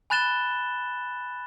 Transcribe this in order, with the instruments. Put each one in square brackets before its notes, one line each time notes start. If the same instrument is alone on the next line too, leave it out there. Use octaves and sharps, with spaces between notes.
[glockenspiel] G#5 B5 F#6 A6 E7 G7